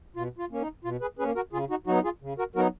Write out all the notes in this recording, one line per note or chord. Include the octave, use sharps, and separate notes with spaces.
B2 F4
F4
A#3 C#4
D#4
B2 F4
G#4 B4
A#3 C#4 G#4 B4
F#4 A#4
C#3 F4 G#4
D#4 F#4
F#3 B3 D#4 F#4
F4 G#4
C#3
F#4 A#4
F#3 B3 D#4 F#4 A#4